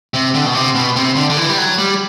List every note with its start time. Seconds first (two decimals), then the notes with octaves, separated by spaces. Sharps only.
0.14 C3
0.34 D3
0.46 B2
0.55 C3
0.75 B2
0.96 C3
1.16 D3
1.30 D3
1.37 E3
1.49 G3
1.58 F#3
1.78 G3